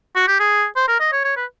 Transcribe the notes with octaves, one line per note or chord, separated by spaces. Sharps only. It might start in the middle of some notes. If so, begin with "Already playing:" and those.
F#4
G4
G#4
C5
A#4
D#5
C#5
C#5
B4